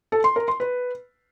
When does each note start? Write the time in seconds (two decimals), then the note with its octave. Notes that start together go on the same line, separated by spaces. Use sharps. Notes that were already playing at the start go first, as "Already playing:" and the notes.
0.12 A4
0.24 C6
0.36 A#4
0.48 C6
0.60 B4